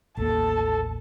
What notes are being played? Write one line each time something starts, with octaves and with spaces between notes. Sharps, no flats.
A1 D#2 A#3 A4 A5